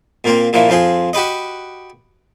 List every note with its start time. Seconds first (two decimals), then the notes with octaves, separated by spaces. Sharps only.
0.24 A#2 A#3 C4
0.53 A#2 E3 F3
0.69 F2 F3 C4 G#4
1.13 F#4 G4 B4 D#5